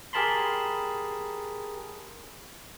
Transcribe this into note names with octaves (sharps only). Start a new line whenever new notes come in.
G4 G#4 A#4 A5 B5 C6